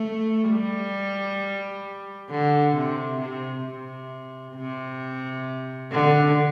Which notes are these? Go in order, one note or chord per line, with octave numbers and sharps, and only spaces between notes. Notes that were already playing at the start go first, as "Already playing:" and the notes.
Already playing: A3
G3
D3
C3
C3
C3
C3
D3